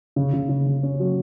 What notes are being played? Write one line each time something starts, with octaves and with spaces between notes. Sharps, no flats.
C#3
C#3
C#3
C#3
C#4
F#3